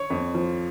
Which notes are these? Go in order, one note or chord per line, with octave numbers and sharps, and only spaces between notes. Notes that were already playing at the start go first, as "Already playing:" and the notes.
Already playing: C#5
F2
F3